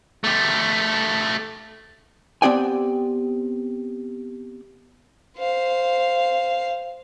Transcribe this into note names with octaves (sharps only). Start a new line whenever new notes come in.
A3 G4
B3 C4 G4 D5 G5 G#5
C5 F5